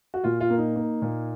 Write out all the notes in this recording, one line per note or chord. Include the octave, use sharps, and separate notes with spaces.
F#4
A#2 F4
F4
A#3
D#4
A#3
A#2